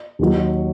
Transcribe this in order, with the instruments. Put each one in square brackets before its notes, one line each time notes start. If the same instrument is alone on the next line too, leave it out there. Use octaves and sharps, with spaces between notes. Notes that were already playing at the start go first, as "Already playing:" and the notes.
[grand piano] D#2 D#3 F#3